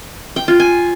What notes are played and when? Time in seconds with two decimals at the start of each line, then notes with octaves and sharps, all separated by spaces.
0.36 G5
0.48 F4
0.60 G#5